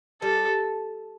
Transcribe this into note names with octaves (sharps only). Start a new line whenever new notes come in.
G3 A4